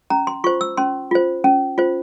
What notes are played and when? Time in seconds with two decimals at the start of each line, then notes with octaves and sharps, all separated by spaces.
0.10 C#4 A#5
0.27 C6
0.44 F4 C5 C#6
0.61 E6
0.77 C#4 C6
1.11 F4 C5
1.44 C#4
1.78 F4 C5